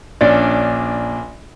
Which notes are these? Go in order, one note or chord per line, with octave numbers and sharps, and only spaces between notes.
A#1 C#4 D4 D5